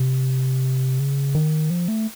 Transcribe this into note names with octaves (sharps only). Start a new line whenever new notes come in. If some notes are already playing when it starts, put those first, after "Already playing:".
Already playing: C3
C#3
D#3
F3
A3